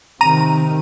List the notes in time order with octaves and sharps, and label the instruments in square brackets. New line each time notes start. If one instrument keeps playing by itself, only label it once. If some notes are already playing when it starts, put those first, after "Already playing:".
[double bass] C3 D#3 [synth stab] A#5 D#7